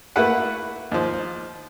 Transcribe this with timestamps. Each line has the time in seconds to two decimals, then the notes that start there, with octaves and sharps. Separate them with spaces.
0.16 A3 A#3 E4 F#4 B4 F#5
0.92 D#2 F3